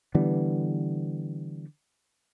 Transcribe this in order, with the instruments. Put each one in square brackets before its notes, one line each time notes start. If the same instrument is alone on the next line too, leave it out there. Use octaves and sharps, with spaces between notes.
[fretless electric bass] D3 E3 G3 B3